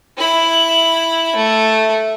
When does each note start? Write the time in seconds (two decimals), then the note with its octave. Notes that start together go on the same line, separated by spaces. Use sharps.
0.18 E4 B5
1.36 A3